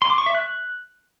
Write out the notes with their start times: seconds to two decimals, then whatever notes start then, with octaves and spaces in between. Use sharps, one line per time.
0.02 C6
0.10 D6
0.18 C#6
0.26 E5
0.35 F#6